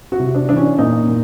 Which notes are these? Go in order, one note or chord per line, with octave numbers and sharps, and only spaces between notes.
F#4
C3
D4
E3 D4
C#4
A#2 D#4
A#2